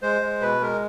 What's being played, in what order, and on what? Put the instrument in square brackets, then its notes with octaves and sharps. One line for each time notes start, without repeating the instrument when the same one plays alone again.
[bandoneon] G#3 C5
G#3
B2 B4
G#3 A#4